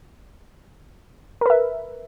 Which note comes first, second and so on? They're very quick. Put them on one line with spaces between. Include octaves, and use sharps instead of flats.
A#4 B4 E5